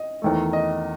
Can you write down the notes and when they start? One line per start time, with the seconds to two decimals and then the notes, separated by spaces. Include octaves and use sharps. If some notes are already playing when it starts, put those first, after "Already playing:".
Already playing: D#5
0.22 E2 D#3 A3
0.53 D#5